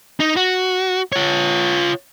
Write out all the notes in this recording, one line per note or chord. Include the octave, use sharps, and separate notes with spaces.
D#4
F#4
F4 C#5